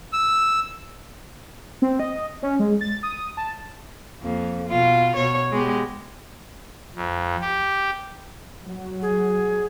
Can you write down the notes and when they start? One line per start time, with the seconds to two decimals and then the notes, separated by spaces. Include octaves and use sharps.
0.13 E6
1.82 C4
2.00 D#5
2.42 C#4
2.59 G#3
2.81 A6
3.03 D#6
3.37 A5
4.22 F2 A#3
4.68 B2 F4
5.16 B2 C#5
5.52 G#3 B3 G4
6.95 F2
7.41 G4
8.61 F#3
9.02 G#4